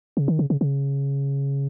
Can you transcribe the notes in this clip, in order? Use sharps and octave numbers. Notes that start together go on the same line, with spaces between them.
C#3
D#3
C#3
C#3
C#3